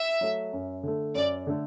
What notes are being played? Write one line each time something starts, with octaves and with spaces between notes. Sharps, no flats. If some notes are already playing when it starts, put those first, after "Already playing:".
Already playing: E5
F#3 A3
F#2
D3 A3
F#2 D5
D3 A3